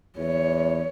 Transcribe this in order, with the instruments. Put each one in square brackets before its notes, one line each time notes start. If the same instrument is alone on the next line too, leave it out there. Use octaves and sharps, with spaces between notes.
[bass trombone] E2 [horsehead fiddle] C#5